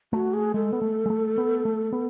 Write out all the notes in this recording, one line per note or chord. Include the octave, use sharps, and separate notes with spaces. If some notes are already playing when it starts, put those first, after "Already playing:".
A3 F#4
G#4
G#3 A4
B3
A3
G#3
A3
B3
A3
B3